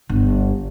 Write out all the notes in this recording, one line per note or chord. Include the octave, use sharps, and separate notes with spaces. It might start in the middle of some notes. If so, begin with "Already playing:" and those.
G1